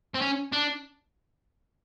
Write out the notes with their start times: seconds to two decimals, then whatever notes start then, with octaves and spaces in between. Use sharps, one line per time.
0.15 C4
0.22 C#4
0.52 D4